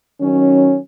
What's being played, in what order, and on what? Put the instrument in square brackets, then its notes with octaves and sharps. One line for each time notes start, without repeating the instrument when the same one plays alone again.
[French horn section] D#3 F#3 C#4